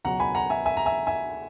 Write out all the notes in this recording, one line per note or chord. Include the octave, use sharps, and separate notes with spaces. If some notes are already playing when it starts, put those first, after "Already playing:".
C#2 B2 F#3 F#5 A#5
G#5 B5
F#5 A#5
E5 G#5
E5 G#5
A#5
E5 G#5
E5 G#5